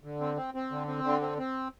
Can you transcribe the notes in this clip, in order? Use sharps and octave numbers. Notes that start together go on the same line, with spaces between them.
D3
C4
C4
C4
D3
C4
D3
C4
C4